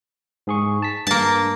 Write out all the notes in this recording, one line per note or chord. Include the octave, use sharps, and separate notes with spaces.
G#2 G#4 C#6
A5 B6
G2 A#3 A5